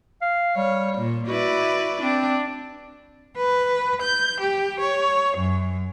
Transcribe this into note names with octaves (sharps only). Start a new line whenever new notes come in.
F5
G3 C#5
A#2
E4 F#4 B4 D5
C4 D4
B4
G6
G4
C#5
F#2